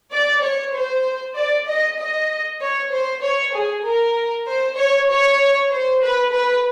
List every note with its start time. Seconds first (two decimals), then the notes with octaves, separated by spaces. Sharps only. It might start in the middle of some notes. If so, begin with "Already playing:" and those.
0.12 D5
0.42 C#5
0.74 C5
1.35 D5
1.67 D#5
1.97 D#5
2.60 C#5
2.91 C5
3.22 C#5
3.53 G#4
3.84 A#4
4.45 C5
4.76 C#5
5.08 C#5
5.70 C5
6.01 B4
6.31 B4